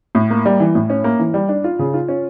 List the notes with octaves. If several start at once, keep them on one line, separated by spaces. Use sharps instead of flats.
A2
A#3
G3
E3
A2
C#4
A#3
E3
G3
D4
F4
C#3
F4
C#4